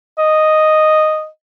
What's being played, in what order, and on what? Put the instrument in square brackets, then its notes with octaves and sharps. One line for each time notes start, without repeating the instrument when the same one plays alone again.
[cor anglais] D#5